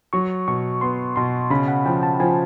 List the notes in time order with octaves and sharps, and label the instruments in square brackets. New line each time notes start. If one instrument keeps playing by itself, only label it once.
[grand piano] F#3 [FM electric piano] C#6
[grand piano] B2 [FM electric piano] C#6
[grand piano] B3 [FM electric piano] C6
[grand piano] B2 [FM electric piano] C6
[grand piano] C#3 [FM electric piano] B5
[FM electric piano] F#5
[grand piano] F3 [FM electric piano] G5
[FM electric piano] A5
[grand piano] F3 [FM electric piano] G#5